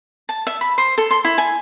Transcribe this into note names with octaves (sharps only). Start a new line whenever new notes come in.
A5
E5
B5
C5
A4
C6
E4
G#5